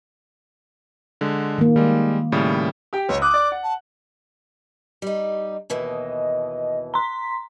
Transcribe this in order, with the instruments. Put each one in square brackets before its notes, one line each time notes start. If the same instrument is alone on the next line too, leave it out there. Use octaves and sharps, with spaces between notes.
[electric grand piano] D3 G#3
[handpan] D#3 A#3
[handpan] D#3 [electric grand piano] G3 G#3
[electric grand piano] A2 C#3 G3
[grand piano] G4 G5
[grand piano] C#2 [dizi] C#5
[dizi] D6 [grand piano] D#6 F#6
[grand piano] D5
F#5
[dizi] A5
[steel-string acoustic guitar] G3 D#4
[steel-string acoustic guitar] D#2 B2 E3 [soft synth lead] D#5
[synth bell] A#5 C6 [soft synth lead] B6